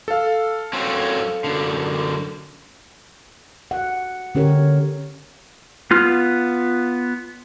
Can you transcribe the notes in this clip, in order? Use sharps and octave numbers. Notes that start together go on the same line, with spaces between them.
A4 F5
F#3 C4 C#4
F#2 D3
F#5
D3 C#4 G4 A#4 C#5
B3 F4 F6